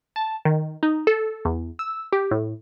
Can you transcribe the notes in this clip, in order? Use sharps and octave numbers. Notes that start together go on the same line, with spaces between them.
A5
D#3
D#4
A4
E2
E6
G4
A2